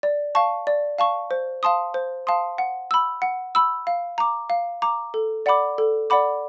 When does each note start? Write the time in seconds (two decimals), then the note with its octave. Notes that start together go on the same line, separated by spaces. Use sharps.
0.03 D5
0.35 F5 A5 C#6
0.67 D5
0.99 F5 A5 C#6
1.31 C5
1.63 F5 A5 C6 D#6
1.94 C5
2.27 F5 A5 C6 D#6
2.58 F#5
2.91 B5 E6
3.22 F#5
3.55 B5 E6
3.87 F5
4.18 A#5 D6
4.50 F5
4.82 A#5 D6
5.14 A4
5.46 D5 F#5 B5 D6
5.78 A4
6.10 D5 F#5 B5 D6